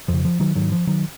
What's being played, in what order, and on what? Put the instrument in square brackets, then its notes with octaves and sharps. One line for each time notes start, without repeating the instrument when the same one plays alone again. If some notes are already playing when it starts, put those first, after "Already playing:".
[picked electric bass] F2 C#3 F3
F3
D#3 F#3
G#2 D#3 F#3
F3
D#3 F#3